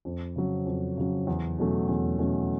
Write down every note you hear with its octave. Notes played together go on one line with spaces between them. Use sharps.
F2
C#3 F#3
F2
C#3 F#3
E2
B2 F#3 A3 C#4
E2
B2 F#3 A3 C#4